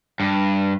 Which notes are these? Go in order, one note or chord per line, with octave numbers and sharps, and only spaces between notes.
G2